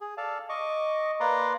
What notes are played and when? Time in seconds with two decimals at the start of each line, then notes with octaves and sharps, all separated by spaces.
0.01 G#4
0.17 A4 D5 F5 A5
0.49 D#5 C#6 D6
1.20 A#3 B4 D5 A#5 C6 D6